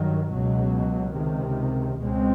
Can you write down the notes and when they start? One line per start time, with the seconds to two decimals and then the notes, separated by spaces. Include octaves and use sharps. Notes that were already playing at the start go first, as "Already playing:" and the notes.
Already playing: G2 D#3 F#3
0.31 C#2 B2 F#3
1.15 C#2 C3 D#3
2.01 C#2 B2 G#3 C4